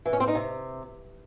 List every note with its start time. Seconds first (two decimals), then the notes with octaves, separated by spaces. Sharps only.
0.06 E3
0.13 C#4
0.20 C4
0.28 D#4
0.35 C3